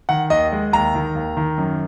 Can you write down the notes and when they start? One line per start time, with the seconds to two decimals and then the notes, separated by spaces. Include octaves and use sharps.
0.09 D#3 F#5
0.30 D#2 D#5
0.52 G#3
0.73 D#2 A#5
0.95 D#3
1.15 D#2
1.37 D#3
1.58 F#2